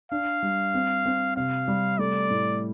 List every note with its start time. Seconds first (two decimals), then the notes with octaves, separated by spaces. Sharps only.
0.12 D4 F5
0.43 G3
0.74 C4
1.05 C4
1.37 C3 F5
1.68 G3
1.99 A3 D5
2.30 A2